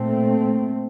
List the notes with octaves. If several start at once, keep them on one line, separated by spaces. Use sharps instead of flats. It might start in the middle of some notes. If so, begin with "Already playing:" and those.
Already playing: A#2 A3 C4